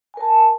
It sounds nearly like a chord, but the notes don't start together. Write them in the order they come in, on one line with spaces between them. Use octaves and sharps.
G#5 A#4 A5